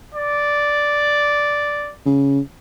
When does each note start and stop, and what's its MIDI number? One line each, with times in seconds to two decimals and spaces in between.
0.14 1.94 74
2.06 2.40 49